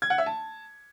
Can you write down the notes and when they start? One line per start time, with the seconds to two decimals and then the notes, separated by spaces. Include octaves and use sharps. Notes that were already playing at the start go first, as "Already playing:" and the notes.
0.02 G#6
0.10 F#5
0.18 E5
0.26 A5